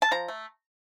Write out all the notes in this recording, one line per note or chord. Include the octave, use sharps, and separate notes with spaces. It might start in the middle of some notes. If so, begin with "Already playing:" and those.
A5
F3 A#5
A3